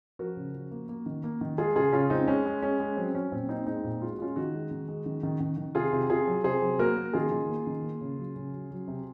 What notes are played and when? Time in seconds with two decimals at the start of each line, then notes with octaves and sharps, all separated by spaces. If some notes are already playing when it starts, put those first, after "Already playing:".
0.19 F3 F#4 A#4
0.37 C#3
0.54 F3
0.71 A#3
0.89 A#3
1.06 D#3
1.24 A#3
1.41 D#3
1.58 G#3 F4 G#4
1.75 C#3 F4 G#4
1.92 C#3 C#4 F4
2.10 G#3 C4 D#4
2.28 G#3 C#4
2.46 G#3
2.63 G#3 C#4
2.80 G#3
2.97 F#3 C4
3.15 F#3 C#4
3.32 A#2 C4
3.49 A#3 C4 D#4
3.67 G#3 C4 D#4
3.84 A#2
4.01 G#3 F4
4.12 F#4
4.19 G#3 C#4 F4
4.36 D#3 D#4 F#4
4.53 G#3
4.71 D#3
4.88 G#3
5.06 D#3
5.23 D#3
5.40 D#3
5.57 D#3
5.75 C3 F4 G#4
5.93 C3
6.10 C3 F4 G#4
6.27 F#3
6.44 C3 G#4 C5
6.62 F#3
6.79 A#3 F#4 A#4
6.97 A#3
7.13 D#3 F4 G#4
7.31 D#3
7.49 A#3
7.67 D#3
7.83 A#3
8.01 C#3
8.18 F#3
8.36 C#3
8.53 F#3
8.71 F#3
8.88 C3